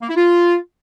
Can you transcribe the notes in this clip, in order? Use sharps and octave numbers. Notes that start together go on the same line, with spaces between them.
A#3
E4
F4